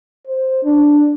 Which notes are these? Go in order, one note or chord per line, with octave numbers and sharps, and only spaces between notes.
C5
D4